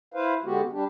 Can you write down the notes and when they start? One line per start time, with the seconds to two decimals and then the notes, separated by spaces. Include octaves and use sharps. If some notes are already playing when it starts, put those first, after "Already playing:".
0.14 E4 B4 C5 F5
0.44 D3 G#3 B3 F#4 G4
0.72 G3 D4 G4